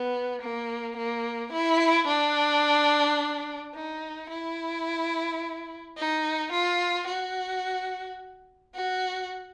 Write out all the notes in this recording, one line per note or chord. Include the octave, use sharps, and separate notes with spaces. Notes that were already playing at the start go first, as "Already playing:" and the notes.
Already playing: B3
A#3
A#3
E4
D4
D#4
E4
D#4
F4
F#4
F#4